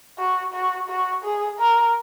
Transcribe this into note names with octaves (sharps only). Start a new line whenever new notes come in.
F#4
F#4
F#4
G#4
A#4